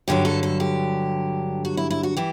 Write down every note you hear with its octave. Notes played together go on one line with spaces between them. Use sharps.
G2 D3 F#3 G4
A4
A4
G4
F#4
E4
E4
F#4
E3 G4